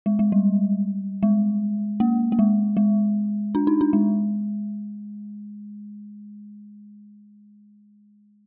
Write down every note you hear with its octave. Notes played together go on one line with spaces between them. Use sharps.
G#3
G#3
G3
G#3
A#3
A#3
G#3
G#3
D4
D#4
D4
G#3